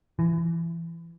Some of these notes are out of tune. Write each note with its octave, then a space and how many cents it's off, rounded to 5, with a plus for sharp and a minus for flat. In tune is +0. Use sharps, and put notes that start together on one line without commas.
E3 +25